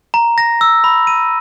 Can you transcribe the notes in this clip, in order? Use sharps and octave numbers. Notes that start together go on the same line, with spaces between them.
A#5
A#6
E6
B5
D#7